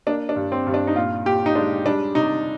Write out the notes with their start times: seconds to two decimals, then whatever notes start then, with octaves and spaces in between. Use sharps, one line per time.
0.07 A#3 D4
0.29 D4
0.36 G2
0.52 C4
0.67 G2
0.74 D4
0.87 D#4
0.96 A#2 F4
1.26 A#2 G4
1.46 D#4
1.55 G#3 D4
1.86 G3 D4
2.15 C3 D#4